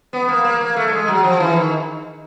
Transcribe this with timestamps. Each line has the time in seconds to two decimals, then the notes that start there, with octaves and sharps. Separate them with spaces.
0.13 B3
0.28 A#3
0.44 A#3
0.60 A#3
0.77 A3
0.88 A3
0.93 G#3
1.08 F#3
1.24 F3
1.40 E3
1.56 D#3